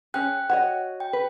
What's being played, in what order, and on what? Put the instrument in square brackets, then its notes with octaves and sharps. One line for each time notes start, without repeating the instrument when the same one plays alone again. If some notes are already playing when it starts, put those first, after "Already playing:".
[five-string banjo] C#4 G#4 [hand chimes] G5 F#6
[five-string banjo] F#4 C#5 D#5
[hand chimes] G5
[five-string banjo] B4